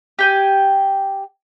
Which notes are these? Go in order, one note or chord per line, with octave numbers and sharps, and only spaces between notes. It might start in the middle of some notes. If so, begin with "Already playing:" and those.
G4 G5 G#5